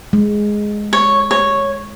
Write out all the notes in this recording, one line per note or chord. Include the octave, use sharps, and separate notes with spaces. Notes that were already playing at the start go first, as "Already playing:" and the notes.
G#3
C#5
C#5